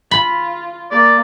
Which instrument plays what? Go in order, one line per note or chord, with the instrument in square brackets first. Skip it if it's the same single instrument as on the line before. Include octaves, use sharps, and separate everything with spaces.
[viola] F4 [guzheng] B5
[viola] A#3 [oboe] D5